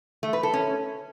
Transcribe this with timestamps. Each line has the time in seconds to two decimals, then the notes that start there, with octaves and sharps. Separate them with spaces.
0.23 A3
0.33 B4
0.43 A4
0.54 C#4